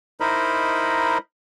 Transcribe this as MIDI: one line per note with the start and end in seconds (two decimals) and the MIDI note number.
0.20 1.18 63
0.20 1.18 64
0.20 1.18 70
0.20 1.18 72
0.20 1.18 75
0.20 1.18 83